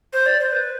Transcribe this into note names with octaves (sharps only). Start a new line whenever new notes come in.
C5
D5
C5
B4